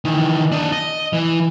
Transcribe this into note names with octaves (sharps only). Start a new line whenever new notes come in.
D#3 E3
D4 D#5
D#5
E3